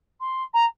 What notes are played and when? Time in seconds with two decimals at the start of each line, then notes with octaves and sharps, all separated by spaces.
0.20 C6
0.53 A#5